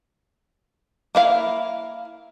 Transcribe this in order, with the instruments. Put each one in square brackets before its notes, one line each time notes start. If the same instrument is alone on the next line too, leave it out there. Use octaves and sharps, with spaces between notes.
[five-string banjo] A#3 E4 F5